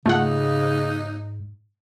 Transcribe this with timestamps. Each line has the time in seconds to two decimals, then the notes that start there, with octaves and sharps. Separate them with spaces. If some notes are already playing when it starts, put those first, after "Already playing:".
0.06 G#2 C#3 A3 D#4 F4 F#5